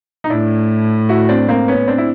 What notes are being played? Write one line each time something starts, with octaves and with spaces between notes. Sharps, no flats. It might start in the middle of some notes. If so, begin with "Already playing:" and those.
D#4
A2 D4 E4
E4 F#4
C4 D4
A#3 C4
B3 C#4
C4 D4
E4